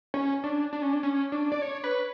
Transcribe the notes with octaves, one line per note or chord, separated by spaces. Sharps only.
C#4
D4
D4
C#4
D4
C#4
D4
D5
C#5
B4